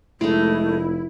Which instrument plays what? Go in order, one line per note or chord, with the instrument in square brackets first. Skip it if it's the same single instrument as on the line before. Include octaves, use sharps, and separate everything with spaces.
[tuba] F1 [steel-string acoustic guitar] G#3 D#4 [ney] A3 [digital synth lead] E4